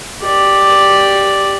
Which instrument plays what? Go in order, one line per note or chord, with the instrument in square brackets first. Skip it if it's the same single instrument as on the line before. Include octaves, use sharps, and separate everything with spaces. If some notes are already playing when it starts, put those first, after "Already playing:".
[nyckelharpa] G4 D5